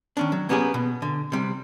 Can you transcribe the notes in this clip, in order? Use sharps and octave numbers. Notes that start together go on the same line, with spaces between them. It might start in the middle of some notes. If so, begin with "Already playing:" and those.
D#3 C#4 D4
F#3
A#3 B3 C#4 G4 G#4
B2
D3
C3 G3